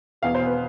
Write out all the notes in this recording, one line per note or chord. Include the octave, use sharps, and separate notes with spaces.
E1 E2 B2 F5
C5
B4